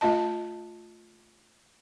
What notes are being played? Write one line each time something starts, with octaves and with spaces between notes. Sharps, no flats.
A3 F4 D#5 A5